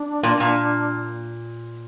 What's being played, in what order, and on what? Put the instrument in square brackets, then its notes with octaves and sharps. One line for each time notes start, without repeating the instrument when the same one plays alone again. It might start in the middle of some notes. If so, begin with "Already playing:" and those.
Already playing: [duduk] D4
[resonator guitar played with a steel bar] A#2
A#2